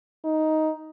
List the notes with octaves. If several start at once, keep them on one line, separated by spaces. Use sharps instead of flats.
D#4